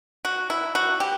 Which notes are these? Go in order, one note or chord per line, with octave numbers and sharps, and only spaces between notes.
F#4
E4
F#4
G4